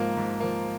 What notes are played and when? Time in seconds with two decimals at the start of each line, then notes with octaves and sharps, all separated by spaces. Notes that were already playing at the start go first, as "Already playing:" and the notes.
Already playing: G#2 F3 A#3
0.17 G#2
0.40 F3 A#3